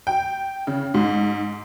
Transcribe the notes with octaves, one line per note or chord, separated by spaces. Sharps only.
G5
C#3
G#2